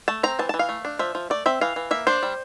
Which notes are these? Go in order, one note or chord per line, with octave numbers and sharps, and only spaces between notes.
A3 A5
C4 A#5
E3 A5
A5
E3
F5
A3
D4
F3 E5
F3
A3 D5
C4 E5
E3 F5
E3
A#3 E5
D4 C5
G3